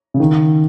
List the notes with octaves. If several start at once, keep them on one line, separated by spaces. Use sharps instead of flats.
C#3
D#3